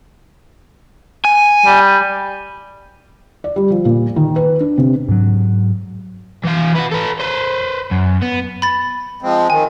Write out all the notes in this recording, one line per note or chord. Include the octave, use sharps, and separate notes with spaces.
G#5
G3
D5
G3
F3
A#2
D#3
B4
D4
C3
G#2 F#3
E3 F5
F#4 B4
A4 B4
B4 C5
F#2
B3
B5 A6
F3 G#3 C4
D#3 G#5